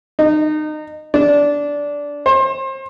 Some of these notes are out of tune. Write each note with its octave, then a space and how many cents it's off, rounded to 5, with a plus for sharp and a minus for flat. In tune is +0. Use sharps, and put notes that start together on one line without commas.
D#4 -30
D4 -15
C5 +35